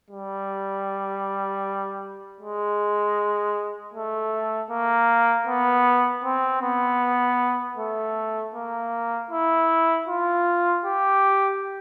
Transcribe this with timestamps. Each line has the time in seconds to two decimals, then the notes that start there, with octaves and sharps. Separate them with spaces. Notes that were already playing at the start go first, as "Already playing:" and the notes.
0.11 G3
2.41 G#3
3.94 A3
4.71 A#3
5.47 B3
6.24 C4
6.63 B3
7.77 A3
8.55 A#3
9.31 E4
10.08 F4
10.85 G4